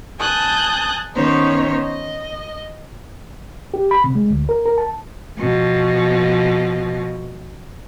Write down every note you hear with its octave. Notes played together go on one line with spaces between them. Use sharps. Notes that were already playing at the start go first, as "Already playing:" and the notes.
G#5 A5 D#6 F#6 G6
D#3 B3 C#4 D#4 C5 C#5
D#5
G4
B5
C3
G#3
D2
A#4
A#4
A5
B2 F3